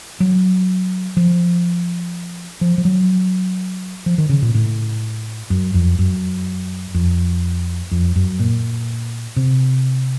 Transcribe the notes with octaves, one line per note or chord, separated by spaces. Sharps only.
F#3
F3
F3
F3
F#3
F3
D#3
C#3
A#2
A2
F#2
F2
F#2
F2
F2
F#2
A#2
C3